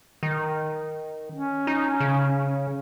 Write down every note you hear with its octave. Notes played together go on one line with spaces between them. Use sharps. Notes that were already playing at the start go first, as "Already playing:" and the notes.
D#3
C#4
D#4
C#3